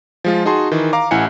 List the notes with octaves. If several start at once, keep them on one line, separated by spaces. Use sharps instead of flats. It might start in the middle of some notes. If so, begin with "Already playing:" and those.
F3 G#3 F4
D#4 F#4 G#4 A5 C6
D#3 E3
F5 A#5 D6
A1 E4 F#5 G#5 C#7